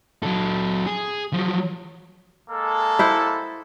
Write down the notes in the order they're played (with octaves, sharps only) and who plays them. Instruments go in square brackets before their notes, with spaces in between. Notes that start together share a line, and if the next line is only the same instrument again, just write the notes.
[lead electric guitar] F#3 A4
G#4
F3 F#3
[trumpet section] G#3 A#3 A4
[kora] E4 C5 F#5